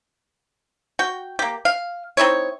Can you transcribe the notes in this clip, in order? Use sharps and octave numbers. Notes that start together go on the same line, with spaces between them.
F#4 G5
A#3 G4
F5
C4 D#4 E4 C#5